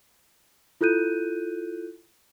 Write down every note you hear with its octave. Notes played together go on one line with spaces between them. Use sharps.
E4 F4 A4 F#6 G6 D#7